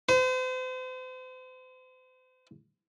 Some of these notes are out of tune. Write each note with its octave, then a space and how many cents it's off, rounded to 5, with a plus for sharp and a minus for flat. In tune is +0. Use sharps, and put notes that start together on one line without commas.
C5 -40